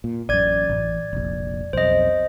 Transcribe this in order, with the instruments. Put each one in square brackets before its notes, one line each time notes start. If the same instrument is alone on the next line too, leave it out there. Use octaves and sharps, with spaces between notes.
[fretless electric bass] A#2
[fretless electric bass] A1 F#2 [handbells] D5 G#6
[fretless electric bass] A1
F1 A#1
[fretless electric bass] B1 F2 [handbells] C5 D#5